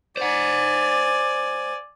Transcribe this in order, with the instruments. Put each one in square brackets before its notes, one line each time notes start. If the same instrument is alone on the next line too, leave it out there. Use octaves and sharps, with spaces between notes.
[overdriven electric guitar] C5 F#5 [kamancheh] D5 G#5